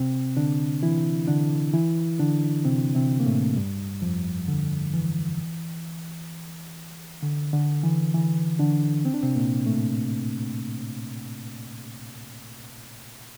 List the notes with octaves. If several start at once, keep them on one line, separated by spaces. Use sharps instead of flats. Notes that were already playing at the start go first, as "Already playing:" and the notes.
Already playing: C3 C4
D3 D4
E3 E4
D3 D4
E3 E4
D3 D4
C3 C4
C3 C4
A#3
A2 A3
G2 G3
F2 F3
D3
E3
D3
D3
E3
E3
D3 D4
C4
D4
C3 C4
A#2 A#3
A2 A3